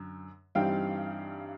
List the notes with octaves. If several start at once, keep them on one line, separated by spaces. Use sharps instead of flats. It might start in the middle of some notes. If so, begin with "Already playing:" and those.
Already playing: F#2 D3
G2 E3 G3 C4 D#4 F5 G5